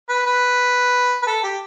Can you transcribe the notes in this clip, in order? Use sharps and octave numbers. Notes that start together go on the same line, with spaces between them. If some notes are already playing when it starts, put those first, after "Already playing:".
B4
B4
B4
A4
G4